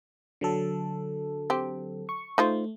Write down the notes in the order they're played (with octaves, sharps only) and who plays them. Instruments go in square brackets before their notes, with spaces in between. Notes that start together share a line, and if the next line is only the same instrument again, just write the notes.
[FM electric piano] D3 F#3 A4
[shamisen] C4 G4
[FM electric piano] C#6
[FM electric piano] A3 [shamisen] D#4 F4 C5